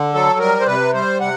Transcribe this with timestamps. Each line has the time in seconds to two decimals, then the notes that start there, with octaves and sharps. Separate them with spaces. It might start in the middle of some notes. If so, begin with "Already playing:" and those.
Already playing: D3
0.14 F#3 A4
0.40 G3 A#4
0.60 C5
0.66 C3 B4
0.94 G3 C5
1.21 C3 F#5